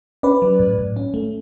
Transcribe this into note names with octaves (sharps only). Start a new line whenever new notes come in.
C#4 B4 D5
F#3
A2
A2
C#4
A3